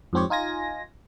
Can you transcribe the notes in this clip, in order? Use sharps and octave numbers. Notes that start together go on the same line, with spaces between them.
F2 G#2 C4 G4 C#5
D#4 F4 G#5 A#6